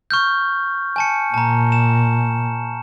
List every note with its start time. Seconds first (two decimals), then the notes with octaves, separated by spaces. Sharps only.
0.11 C#6 F6 G6
0.96 G#5 A5 C#7
1.34 A#2 A5 A#5
1.72 E7